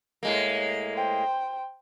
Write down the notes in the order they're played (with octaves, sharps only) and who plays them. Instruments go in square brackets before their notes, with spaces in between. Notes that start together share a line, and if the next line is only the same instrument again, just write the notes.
[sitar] A2 G#3 A#3
[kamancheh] C5 G5